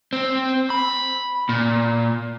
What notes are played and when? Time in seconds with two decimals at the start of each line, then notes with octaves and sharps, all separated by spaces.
0.13 C4
0.70 B5
1.49 A#2